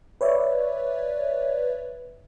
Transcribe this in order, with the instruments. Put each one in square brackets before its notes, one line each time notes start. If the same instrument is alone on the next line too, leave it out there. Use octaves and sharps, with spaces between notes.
[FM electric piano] B4 C#5 D5 E5